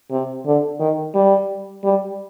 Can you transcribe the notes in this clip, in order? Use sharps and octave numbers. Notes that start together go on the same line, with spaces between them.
C3
D3
D#3
G3
G3